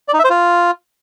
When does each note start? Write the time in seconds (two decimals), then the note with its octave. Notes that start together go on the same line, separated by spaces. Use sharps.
0.08 D5
0.14 D#4
0.19 E5
0.24 C5
0.30 F4